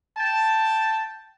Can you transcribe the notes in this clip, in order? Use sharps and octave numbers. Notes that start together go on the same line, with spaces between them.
G5 A5